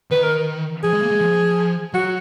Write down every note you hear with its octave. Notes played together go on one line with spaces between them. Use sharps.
D#3 B4
A#4
F3 G#4
G#3
A#3
G#3
F3
F#3 F#4